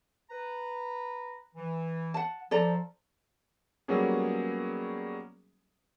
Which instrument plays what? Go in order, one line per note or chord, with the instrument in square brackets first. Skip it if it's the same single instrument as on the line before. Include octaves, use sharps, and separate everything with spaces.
[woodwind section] B4 A#5
E3
[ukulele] F#5 A5
[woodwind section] F3 [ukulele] A4 D5 A#5
[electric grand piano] F#3 G3 A#3 B3 C#4 G#4